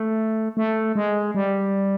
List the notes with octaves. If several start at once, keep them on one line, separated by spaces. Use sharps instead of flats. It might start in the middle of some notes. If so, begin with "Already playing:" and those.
Already playing: A3
A3
G#3
G3